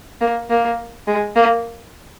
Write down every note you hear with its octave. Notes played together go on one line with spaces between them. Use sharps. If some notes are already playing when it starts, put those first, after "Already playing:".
A#3
A#3
G#3
A#3